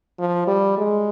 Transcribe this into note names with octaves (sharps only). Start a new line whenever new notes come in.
F3
G3
G#3